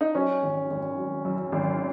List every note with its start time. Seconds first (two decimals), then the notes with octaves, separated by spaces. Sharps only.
0.01 D#4
0.15 F#3 C#4
0.43 G#1
0.70 G#1
0.97 F#3
1.25 F#2
1.52 G#1